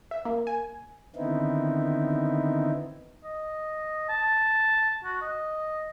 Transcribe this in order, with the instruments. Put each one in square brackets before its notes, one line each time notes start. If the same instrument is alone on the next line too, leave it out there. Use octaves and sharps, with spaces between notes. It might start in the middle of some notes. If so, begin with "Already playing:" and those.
[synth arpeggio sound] E5
A#3
G#5
[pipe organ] D3 D#3 B3 C4 D#4 E4
[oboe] D#5
A5
F#4
D#5